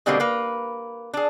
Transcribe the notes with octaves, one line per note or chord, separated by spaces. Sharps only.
B2 D3 G3 G#3 A#3 C4
A#3 B4
D4 G#4